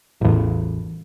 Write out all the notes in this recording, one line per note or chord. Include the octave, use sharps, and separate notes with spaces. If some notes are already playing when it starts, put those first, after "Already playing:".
A1 E2